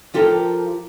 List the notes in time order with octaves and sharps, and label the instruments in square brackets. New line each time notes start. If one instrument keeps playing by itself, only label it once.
[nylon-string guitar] F3 F4 G4 A4 A#4